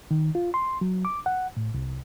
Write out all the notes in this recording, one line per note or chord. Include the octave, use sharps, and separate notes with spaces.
D#3
F4
C6
F#3
D6
F#5
A2
C2